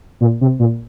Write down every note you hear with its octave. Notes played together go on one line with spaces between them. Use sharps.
A#2
C3
A#2